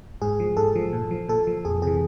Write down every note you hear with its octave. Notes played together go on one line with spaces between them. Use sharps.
G#2 G#4
F3
G#2 A4
F3
A#2
F3
A#2 A4
F3
F2 G#4
C3 E3 G#4